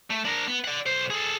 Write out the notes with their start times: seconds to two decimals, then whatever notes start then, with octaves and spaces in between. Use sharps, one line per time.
0.10 A3
0.25 D4 A#4
0.47 B3
0.64 D5 F#5
0.86 B1 C5
1.10 G#4 A4